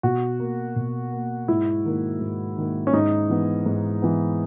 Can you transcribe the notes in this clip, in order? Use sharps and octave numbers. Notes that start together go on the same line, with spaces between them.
B2 F#4
A#3
B2
A#3
G#2 E4
D#3 A#3
G#2
D#3 A#3
C#4
G#2 D#4
E3 B3
G#2
E3 B3